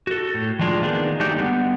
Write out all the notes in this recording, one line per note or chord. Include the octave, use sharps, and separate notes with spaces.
F#4 A4
A2
D#3 F3 G#3 D4 F4
D#3 A#3 B3 D4 D#4 G#4
F#3 A3 D4 D#4 G4
D3 G3 B3